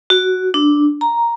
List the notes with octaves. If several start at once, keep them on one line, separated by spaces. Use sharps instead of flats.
F#4
D4
A#5